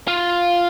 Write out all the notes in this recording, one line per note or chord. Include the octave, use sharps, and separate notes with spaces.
F4